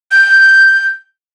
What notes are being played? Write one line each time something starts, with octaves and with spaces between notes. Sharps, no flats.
G6